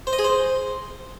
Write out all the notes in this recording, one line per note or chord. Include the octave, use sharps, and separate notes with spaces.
C5
D#5
G#4
C5